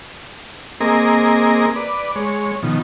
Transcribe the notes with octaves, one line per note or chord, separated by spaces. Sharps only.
A#3 C4 G#4 A#4 D#5
B4 D5
G#3 C#5
B2 D#3 F3